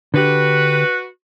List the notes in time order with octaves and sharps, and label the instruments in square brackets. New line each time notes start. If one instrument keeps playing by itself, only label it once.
[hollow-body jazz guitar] D3 G4 [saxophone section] F#4 B4